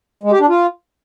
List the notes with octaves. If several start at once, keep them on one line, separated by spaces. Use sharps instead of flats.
G#3
G4
D4
F4